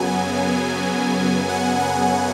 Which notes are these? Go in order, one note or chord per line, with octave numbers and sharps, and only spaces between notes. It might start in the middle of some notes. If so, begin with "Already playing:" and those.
Already playing: F#2 C#3 F#3 B3 G#5
F#5
G#5